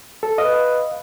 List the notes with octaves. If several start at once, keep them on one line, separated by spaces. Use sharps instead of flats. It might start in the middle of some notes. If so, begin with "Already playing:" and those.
A4
B4 D#5 F5